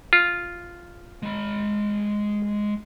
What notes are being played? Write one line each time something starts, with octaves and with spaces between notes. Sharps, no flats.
F4
G#3 B5